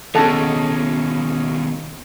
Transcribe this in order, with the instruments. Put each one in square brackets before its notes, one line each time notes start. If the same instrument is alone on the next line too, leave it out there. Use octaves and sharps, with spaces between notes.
[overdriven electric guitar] D#2 B2 [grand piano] C#4 G#4 D#5 [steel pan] A4 F#5 A5